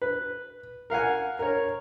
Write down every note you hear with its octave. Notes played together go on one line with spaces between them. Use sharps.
B4
A#4 F5 F#5 G#5
A#4 C#5